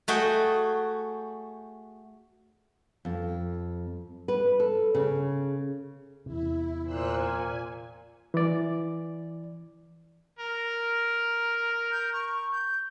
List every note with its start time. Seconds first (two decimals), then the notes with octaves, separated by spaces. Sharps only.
0.08 A3 F#4 G#4 G5
3.05 F2
4.28 B4
4.60 A4
4.95 C#3
6.26 E2 C3 E4
6.84 A#2 C5 E6 F#6
7.14 G#5
8.34 E3 D5
10.39 A#4
11.91 G6
12.13 C#6
12.51 G6